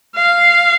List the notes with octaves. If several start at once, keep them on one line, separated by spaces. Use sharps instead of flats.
F5